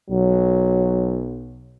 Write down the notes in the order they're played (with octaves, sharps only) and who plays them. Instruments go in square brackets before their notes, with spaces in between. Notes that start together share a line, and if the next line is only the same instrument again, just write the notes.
[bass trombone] B1 [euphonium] F#3